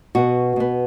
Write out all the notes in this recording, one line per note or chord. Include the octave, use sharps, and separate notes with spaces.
B2 B3 F#4
B2 B3